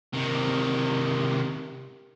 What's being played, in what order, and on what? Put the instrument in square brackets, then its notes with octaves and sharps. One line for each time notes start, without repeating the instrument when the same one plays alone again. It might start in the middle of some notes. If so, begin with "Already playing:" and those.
[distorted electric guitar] C3 D#3